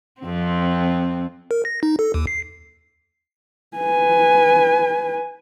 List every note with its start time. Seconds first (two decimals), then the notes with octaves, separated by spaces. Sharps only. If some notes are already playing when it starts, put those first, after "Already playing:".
0.21 F2 C4
1.51 A#4
1.65 A#6
1.83 D#4
1.99 A4
2.14 D#2
2.27 C7
3.77 B4 G#5